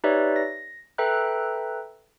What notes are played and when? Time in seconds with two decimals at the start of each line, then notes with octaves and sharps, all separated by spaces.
0.04 D#4 G4 B4 C#5 D5 E5
0.36 A#6
0.98 A4 B4 E5 G5 A#5 F#6